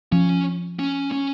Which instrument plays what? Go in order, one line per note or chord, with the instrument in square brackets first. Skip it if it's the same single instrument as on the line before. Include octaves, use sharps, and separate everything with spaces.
[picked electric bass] F3 [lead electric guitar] C#4
[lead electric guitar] C#4
C#4